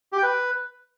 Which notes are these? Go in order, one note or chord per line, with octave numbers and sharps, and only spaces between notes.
G4
G5
B4